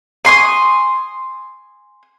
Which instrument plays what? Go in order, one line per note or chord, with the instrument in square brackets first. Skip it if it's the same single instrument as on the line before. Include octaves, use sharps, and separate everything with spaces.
[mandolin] G#5 C6 C#6 D#6